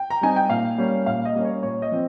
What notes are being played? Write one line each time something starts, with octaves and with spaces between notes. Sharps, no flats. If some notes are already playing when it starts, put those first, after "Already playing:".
Already playing: G5
A#5
G3 C4 D#4 G#5
G5
A#2 F5
G3 A#3 C#4
A#2 F5
D#5
G3 A#3 C#4
C#5
A#2 C#5
D#5
F3 C4